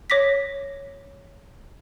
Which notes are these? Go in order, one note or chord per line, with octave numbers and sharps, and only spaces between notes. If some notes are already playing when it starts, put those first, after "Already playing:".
C#5 D6 A#6 B6